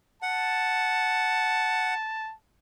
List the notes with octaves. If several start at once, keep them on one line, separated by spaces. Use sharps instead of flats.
F#5 A5